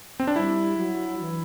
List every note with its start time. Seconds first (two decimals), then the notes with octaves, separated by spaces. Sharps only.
0.20 C4
0.27 D4
0.36 G3 E4
0.78 F#3
1.20 E3